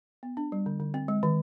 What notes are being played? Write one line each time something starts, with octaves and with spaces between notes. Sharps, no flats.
B3
D4
G3
D3
D3
C4
G#3
D#3